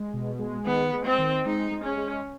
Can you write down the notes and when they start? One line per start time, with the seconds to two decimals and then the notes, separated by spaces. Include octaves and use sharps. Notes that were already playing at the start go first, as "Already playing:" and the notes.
Already playing: G#3
0.13 B2
0.39 G#3
0.66 D#3 B3
0.93 G#3
1.05 C4
1.18 D#3
1.45 G#3 D#4
1.71 G#3
1.84 C#4
1.97 G#3